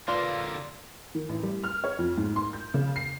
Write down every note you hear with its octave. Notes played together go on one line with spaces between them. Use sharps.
D3 A#3 F4 B4 D5 C6
D#3
A1
G3
F6
C#5
F2
G#2
C6
G6
C#3
C7